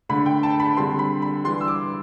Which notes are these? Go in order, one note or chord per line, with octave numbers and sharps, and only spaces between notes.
D3 A3 D4 B5
G5
A5
B5
D3 G3 C4 C6
B5
B5
E3 G3 D4 C6
E6
D6